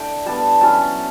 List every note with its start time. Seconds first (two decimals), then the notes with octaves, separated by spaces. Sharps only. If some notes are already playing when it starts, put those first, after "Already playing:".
Already playing: A3 D4 E4 G5 A5
0.26 G3 B3 D4 A5
0.61 F#3 C#4 E4 A5